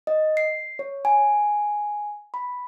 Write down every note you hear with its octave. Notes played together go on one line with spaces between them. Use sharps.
D#5
C7
C#5
G#5
B5